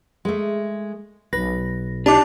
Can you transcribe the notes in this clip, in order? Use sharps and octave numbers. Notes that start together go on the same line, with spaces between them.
G#3 A3
B1 B4 A#6
D4 D#4 G4 A5 D6